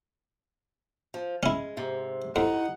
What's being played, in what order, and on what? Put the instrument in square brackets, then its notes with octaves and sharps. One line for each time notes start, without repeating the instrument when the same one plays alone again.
[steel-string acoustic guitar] F3
[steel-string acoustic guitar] G#3 [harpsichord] C#4 E4
[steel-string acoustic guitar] G#2 C3
[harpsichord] F2 [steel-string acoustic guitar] D#4 [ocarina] E4 [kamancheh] F#5